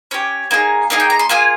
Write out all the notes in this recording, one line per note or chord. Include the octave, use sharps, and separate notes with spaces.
C#4 G4 C#5
A#3 D#4 G#4
A#3 D#4 G#4 D#5
G5
A#5
C6
A#3 F4 G#4 G#5